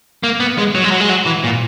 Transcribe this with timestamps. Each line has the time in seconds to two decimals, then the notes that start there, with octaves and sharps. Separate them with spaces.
0.23 A#3
0.40 B3
0.58 G#3
0.75 F#3
0.84 G#3
0.91 F#3
1.01 G#3
1.09 F#3
1.26 E3
1.44 A#2